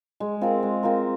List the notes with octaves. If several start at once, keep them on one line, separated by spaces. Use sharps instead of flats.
G#3
C4 F4 A#4
G#3
C4 F4 A#4